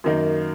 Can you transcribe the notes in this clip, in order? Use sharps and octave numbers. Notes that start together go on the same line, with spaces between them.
F#2 D#3 A#3 D#4